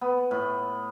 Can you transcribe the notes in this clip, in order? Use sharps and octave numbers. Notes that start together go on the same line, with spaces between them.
B3
A2